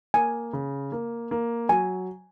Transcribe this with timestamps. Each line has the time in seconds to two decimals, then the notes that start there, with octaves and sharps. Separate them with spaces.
0.14 A#3 G#5
0.53 C#3
0.92 A#3
1.31 A#3
1.69 F#3 G#5